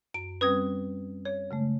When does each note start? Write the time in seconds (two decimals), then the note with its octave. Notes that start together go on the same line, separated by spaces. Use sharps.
0.14 F#2 D7
0.41 G3 C4 C#4 B4 D#6 G#6
1.25 C#5
1.51 C#3 G#3 A3